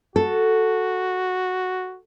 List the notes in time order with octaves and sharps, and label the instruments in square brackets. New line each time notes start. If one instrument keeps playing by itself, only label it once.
[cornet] F#4 [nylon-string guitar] A4